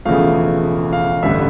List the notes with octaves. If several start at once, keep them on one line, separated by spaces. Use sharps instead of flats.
E1 E2 C#3 F3 A3 F5
F5
A1 G2 D3 A3 E5